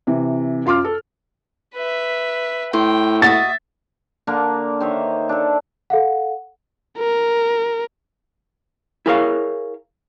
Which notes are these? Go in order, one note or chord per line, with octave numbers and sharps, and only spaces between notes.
C3 E3
F#2 F4 C6 D6 F6
A4
B4 E5
A2 C5 G5
F#4 D#5 E5 A6
D3 A#3 D4 A#4
D#3 C5 C#5 E5
D4 A4
A4 F5 F#5
A#4
E4 G#4 A#4 C#5 F5